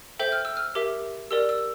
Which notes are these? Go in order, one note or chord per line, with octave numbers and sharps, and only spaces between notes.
A4 C5 E5 G5 G6
F6
E6
F6
G4 A#4 E5 D6
G4 A#4 D5 E6
E6